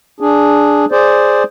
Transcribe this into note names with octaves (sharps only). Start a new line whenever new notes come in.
D4 G#4
G#4 C5 D5